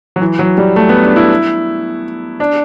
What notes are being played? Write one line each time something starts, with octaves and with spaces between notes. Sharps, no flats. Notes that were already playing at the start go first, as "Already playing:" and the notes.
F#3
E3
F#3
G3
A3
B3
D4
E4
D4